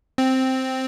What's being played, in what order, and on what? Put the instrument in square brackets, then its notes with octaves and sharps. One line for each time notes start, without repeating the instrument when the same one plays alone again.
[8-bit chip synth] C4